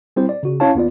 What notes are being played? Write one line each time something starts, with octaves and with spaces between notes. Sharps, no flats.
G3 C4 E4 G4 C5
D5
C#3 F#4
C#4 E4 C#5 F5 A5
D#2 B3 F4 D5